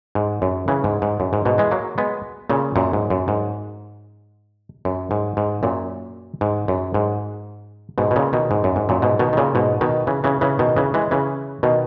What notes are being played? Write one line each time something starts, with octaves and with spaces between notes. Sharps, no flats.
G#2
F#2
C#3 E3
G#2
G#2
F#2
G#2
G#2 B2
E3 G#3
F#3 A#3
G#3 B3
A#2 C#3
F#2 A#2
G#2
F#2
G#2
F#2
G#2
G#2
F#2 A#2
G#2
F#2
G#2
G#2 B2
B2
A#2 C#3
B2 D#3
G#2
F#2
G#2
F#2 A#2
G#2 B2
B2 D#3
D#3
A#2 C#3
G#2 B2
B2 D#3
C#3 E3
C#3 E3
C#3 E3
B2 D#3
C#3 E3
E3 G#3
C#3 E3
B2 D#3